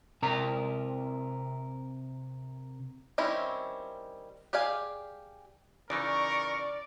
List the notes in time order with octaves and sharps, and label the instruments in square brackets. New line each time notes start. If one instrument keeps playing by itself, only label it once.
[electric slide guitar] C3 A#4 A#5
[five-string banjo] D#3 G3 C4 C#4 E4
G4 G#4 D5 F5 G#5
[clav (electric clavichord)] C#3 E3 D#4 [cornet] A#4 [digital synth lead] D5 [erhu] C#6